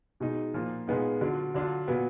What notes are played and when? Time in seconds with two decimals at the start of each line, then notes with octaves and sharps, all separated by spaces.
0.20 B2 G#3 D#4
0.54 A#2 F3 A#3 F4
0.87 A#2 G#3 B3 D#4
1.21 D3 F#3 D4 F4
1.54 D3 F#3 D4 F4
1.88 A#2 F#3 B3